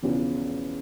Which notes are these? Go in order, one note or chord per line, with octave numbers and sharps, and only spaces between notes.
E1 E2 C#3 F3